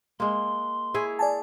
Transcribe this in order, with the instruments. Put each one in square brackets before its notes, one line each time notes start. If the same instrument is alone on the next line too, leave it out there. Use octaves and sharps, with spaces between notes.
[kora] G#3 A#3 [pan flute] C6
[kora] E4 G#4 C#5
[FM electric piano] D5 G#5 A5